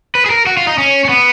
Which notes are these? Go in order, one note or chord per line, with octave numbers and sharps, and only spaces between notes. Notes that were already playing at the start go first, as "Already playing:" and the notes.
B4
G#4
A#4
F#4
F4
D#4
C#4
C#4
B3